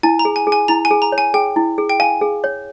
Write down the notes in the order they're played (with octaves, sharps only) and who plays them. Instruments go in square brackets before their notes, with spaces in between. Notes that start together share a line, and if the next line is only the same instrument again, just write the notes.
[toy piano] E4 [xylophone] G#5
[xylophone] A#5
[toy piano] G#4
[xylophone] G#5
[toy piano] G#4
[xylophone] G#5
[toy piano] E4 [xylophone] A#5
[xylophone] G#5
[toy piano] G#4
[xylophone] A#5
[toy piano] C#5
[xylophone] G#5
[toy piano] G#4 [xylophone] G5
[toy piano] E4
G#4
[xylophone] G5
[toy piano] F5 [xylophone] G#5
[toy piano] G#4
C#5